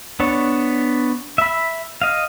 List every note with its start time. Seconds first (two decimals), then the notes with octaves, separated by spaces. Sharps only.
0.20 B3 D4 C#5
1.38 E5 B5
2.02 D#5 F5